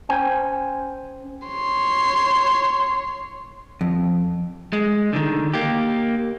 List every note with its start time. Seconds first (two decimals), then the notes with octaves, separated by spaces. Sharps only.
0.09 C#4 C5 G5 G#5
1.47 C#5 C6
3.81 F2
4.73 G#3
5.13 D3 D#3
5.54 A#3 G4